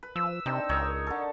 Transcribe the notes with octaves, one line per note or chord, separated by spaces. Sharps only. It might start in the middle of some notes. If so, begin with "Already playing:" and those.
B4
F3 E6
C3 C4 D4 D#4
C#2 A#4 C#5 D#5
D3 A4